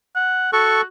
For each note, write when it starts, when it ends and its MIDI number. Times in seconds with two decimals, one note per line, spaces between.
0.16 0.49 78
0.53 0.83 66
0.53 0.81 69
0.53 0.81 85